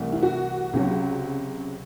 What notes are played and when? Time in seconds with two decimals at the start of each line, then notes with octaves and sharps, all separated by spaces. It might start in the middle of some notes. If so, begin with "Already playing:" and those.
Already playing: C2 C3 E3 A3
0.12 E4
0.23 F#4
0.73 C#2 C3 F#3